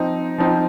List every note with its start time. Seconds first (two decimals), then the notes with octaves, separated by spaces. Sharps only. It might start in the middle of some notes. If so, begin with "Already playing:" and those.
Already playing: F3 C4 D#4
0.38 F3 C4 D#4